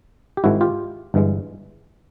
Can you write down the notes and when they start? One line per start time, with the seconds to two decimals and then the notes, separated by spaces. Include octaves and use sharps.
0.37 G4
0.44 G#1 G#2 D#3 G#3 E4 F#4
0.61 F4 G4
1.14 G1 G2 E3 G#3